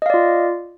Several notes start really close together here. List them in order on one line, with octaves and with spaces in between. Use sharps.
D#5 F5 D5 F4